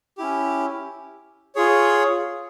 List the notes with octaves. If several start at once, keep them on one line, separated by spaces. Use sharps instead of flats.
C#4 E4 G4
F4 G#4 C#5